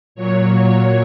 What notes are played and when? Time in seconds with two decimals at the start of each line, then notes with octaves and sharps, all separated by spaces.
0.15 A#2 F#3 C#5
0.53 C#5